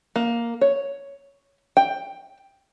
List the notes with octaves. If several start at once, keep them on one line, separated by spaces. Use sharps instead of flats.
A#3
C#5
G5